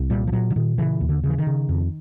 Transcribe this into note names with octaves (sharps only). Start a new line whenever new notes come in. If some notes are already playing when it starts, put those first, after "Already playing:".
Already playing: C2
A#2 G3
F3
A#2 F#3
D3
A#2 D#3
C#3 E3
D#2
D3
C#3
E3
D#3
C#3
F2